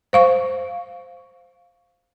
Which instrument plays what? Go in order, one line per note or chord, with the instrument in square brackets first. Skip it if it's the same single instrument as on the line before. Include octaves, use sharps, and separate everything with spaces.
[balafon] C5 F5 C#6